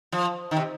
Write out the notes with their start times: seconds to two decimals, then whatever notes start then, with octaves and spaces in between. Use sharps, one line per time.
0.12 F3
0.51 D#3
0.57 C3